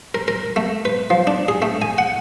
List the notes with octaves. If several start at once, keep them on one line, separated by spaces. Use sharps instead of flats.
A#4
A#4
A3
B4
F3
D4
G#4
A3
G#5
F#5